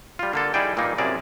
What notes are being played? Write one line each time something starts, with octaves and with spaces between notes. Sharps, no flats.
G3 F4
D3 A#3 A4
G3 D#4 E4 G#4 D5 G5
A#2 E3 G3 A#3 D#4
F#2 C3 E4 G#4 A#4 D5